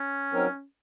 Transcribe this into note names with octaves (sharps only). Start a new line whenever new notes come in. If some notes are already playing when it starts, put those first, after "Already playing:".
Already playing: C#4
F#3 C4 D#4 A#4 C#5